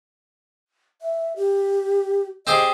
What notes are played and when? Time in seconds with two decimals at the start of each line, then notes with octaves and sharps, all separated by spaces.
1.02 E5
1.36 G4
2.47 C4 G4 G#4 D#5